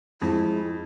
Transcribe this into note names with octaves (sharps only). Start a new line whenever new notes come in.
F2 G#3 E4